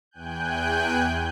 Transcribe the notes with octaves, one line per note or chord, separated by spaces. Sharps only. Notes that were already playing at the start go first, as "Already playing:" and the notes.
E2 G5 G#5 F#6 G6